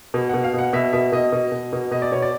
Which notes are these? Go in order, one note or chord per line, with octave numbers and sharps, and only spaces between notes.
B2
B2 F#5
F5
B2 F#5
B2 E5
B2 E5
B2 D#5
B2
B2
B2
B2 D#5
D5
B2 C#5
D5